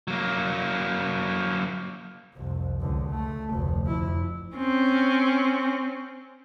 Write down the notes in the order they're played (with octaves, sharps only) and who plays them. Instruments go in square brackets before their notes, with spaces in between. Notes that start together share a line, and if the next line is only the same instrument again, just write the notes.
[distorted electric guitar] F#3 A#3
[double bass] C2 F2
C#2 D3
A3
F1 D2
F2 E4
[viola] C4 C#4